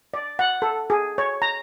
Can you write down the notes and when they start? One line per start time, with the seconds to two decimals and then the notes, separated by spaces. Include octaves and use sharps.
0.14 D5
0.39 F#5
0.62 A4
0.90 G#4
1.18 C#5
1.42 A#5